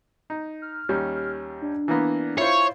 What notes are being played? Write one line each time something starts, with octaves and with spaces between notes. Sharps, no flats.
D#4
F6
D#2 G3 C#4
D4
E3 A#3 B3
E4 F4 C5 C#5